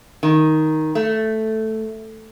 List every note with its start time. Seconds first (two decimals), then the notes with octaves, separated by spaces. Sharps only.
0.23 D#3
0.95 A3